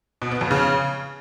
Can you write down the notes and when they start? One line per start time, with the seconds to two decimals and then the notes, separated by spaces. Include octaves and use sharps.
0.22 B2
0.31 B3
0.41 F2
0.51 C#3